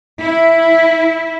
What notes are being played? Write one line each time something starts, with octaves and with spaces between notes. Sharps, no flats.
E4